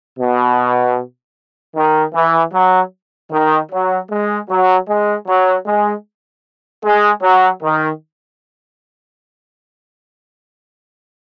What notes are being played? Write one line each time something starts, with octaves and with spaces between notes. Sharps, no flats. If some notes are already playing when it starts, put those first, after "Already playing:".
B2
D#3
E3
F#3
D#3
F#3
G#3
F#3
G#3
F#3
G#3
G#3
F#3
D#3